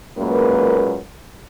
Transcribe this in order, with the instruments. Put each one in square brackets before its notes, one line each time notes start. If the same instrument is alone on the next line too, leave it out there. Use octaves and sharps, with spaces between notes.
[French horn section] F#2 A#2 G#3 A#3 B4